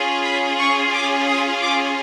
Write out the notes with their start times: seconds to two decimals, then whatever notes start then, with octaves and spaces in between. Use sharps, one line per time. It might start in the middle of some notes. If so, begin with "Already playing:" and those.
Already playing: C#4 F4 G#4
0.24 B5
0.58 C#6
0.93 D6
1.27 D#6
1.61 D6